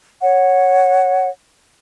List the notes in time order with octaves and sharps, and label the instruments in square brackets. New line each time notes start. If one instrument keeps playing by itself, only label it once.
[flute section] C#5 F#5